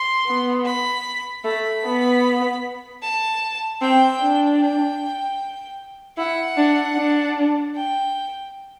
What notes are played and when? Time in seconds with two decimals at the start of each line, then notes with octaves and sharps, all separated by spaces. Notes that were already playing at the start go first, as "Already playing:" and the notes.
Already playing: C6
0.26 B3
0.65 B5
1.44 A3 B5
1.85 B3
3.02 A5
3.81 C4 G5
4.21 D4
4.60 G5
6.18 E4 F#5
6.57 D4
6.96 D4
7.76 G5